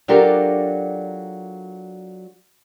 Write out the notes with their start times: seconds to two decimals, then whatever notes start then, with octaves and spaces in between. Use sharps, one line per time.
0.08 F#3 D4 F4 G4 A4 A#4